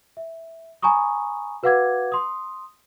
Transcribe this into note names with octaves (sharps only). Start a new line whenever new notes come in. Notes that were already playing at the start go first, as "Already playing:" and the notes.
E5
G#5 A#5 B5 C#6 D#6
F#4 B4 F5 F#5 D6 G#6
C6 D#6